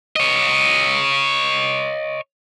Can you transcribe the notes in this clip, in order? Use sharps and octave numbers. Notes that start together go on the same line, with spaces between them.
C#5 D#5